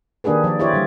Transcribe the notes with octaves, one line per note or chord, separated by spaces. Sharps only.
D#3 A#3 D4 G4 G#4 B4
F3 D5
E4 F4 G4 C#5 D5
D3 G3